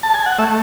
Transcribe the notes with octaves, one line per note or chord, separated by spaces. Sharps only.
A5
G#5
F#5
A3 E5